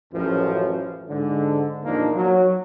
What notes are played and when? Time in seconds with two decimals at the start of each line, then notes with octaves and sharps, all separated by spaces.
0.13 A1 F#2 F3
1.09 G#2 D3
1.84 E2 A#2 F3 A#3 D4 D#4
2.15 F#3